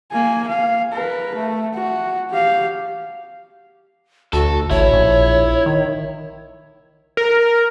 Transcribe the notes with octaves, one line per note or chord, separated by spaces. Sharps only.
A#3 G#5
F5
A#4 B4
A3
F#4
G4 F5
D2 F#4 A4
A1 E4 C#5
A#1
D#3
A#4